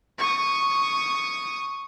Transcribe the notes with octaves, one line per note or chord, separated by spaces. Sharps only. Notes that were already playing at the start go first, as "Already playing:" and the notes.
C#6 D#6